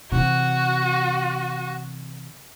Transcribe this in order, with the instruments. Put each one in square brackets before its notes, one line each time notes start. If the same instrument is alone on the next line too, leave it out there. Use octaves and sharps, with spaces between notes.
[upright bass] C3 E3 [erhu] F#4